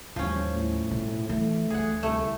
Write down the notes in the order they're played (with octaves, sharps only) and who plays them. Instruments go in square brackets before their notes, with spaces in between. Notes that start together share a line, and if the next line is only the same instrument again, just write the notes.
[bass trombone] A1 [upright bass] D#2 G3 [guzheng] F3 C#4
[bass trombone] A2
[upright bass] B2 G#3
[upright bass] E3 F#3 [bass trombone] A3
[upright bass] D2 [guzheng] G#4 F#5
[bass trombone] C2 [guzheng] A3